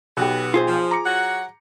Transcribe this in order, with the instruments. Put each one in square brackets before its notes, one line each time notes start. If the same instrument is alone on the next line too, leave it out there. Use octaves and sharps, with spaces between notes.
[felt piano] B1 G4 [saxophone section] B3 F#4
[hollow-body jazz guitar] F4 G#4 C5
[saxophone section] F3
[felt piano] A#5 D6 C#7
[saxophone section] F#3 F#4 F#5